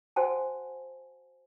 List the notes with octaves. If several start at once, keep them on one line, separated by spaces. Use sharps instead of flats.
F#4 C5 F#5 G#5 A5